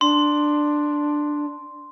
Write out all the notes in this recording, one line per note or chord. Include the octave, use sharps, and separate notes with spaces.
D4 C6